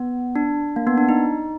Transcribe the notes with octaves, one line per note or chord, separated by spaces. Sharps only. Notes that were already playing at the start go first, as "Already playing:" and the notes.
Already playing: B3
D4
A#3
B3
D4
D#4